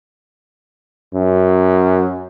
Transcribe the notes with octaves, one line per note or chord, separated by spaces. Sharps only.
F#2